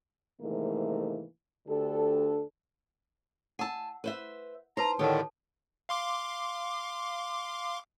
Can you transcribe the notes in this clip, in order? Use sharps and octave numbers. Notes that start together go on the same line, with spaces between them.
G#2 C3 D#3 E3 A3 A#3
D2 D3 D4 G4 A4
F#5 G#5 A5 E6
B4 C5 E5
D#4 B4 C5 A5 A#5
A2 D3 D#3 G4 A4 C#5 A5
F5 C6 D6